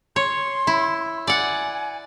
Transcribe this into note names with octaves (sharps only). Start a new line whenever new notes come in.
C#5 C6
E4
D5 F#5 G#5